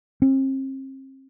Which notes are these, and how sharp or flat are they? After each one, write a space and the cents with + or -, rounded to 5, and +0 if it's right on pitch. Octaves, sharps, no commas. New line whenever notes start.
C4 +40